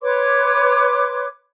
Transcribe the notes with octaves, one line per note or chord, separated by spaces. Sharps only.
B4 C#5 C6 D6